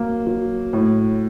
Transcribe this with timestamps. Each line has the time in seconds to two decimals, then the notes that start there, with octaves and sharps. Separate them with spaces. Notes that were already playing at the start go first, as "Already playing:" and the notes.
Already playing: F#3 A#3
0.27 F#3
0.73 A2